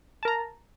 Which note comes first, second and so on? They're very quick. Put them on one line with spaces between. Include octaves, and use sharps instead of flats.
A5 A#4 A#5